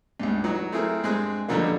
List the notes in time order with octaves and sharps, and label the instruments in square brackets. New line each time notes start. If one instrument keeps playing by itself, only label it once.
[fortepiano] C#2 G2
E3 F#3 D#4
F#3
A3 C4 E4 G#4 A#4
G2 G#3 C4 G#4 F#6
F2 B2 D3 F#3 G3 A#3